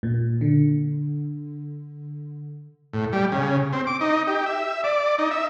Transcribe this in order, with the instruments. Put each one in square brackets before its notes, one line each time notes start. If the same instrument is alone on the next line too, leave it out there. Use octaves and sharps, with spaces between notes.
[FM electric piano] A#2
D3
[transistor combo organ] A2
G3
C#3
C4
D6
D#4
G4
E5
D5
D#4
E5